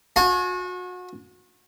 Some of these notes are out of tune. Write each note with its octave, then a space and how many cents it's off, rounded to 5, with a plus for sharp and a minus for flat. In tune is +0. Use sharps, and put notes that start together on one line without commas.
F#4 -35 G#5 +35